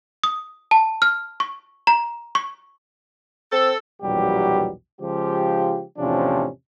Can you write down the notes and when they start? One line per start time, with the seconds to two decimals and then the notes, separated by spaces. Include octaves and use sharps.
0.24 D#6
0.71 A5
1.02 F6
1.40 C#6
1.87 A#5
2.35 C#6
3.53 C4 A4
4.02 A#1 E2 B2 F#3 G3 G4
5.00 C#3 F3 G#3 F4 G4
5.98 E2 A2 C3 F3 C#4 D4